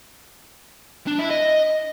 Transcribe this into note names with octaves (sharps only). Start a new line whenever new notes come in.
D4
E4
D#5